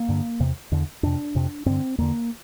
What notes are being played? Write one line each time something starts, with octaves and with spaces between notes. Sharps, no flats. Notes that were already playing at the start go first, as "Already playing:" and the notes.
Already playing: A#3
G2 D3
E2 C3
E2 D3
F2 C3 D4
F2 C3
G2 D3 C4
E2 D3 A#3